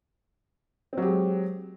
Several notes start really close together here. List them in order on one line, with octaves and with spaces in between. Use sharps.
C4 F#3 G4 G#3